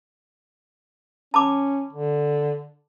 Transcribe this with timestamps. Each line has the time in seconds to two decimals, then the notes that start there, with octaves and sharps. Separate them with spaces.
1.34 C#4 A5 B5 D6
1.93 D3